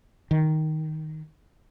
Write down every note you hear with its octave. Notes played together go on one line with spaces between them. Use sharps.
D#3